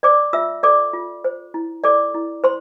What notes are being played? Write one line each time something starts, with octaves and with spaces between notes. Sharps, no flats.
C5 D5 D6
F4 E5 E6
A4 D5 D6
F4
C5
E4
A4 D5 D6
E4
C5 C6